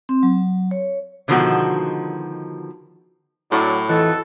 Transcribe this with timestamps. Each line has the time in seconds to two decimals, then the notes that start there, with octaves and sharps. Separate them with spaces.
0.09 C4
0.23 F#3
0.71 C#5
1.28 B2 D3 D#3 F3 G#3 F#4
3.52 A2 F#3 D4
3.89 F2 E3 F#4 A4 D#5